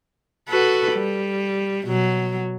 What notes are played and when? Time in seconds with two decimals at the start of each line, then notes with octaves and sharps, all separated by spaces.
0.49 F#4 A4 B4
0.93 G3
1.87 B2 F#3